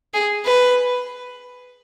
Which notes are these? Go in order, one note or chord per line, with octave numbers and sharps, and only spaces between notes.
G#4
B4